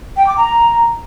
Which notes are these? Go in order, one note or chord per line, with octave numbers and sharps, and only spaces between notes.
G5
D6
A#5